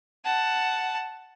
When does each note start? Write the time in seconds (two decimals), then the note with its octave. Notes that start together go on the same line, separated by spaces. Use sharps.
0.24 F#5 A5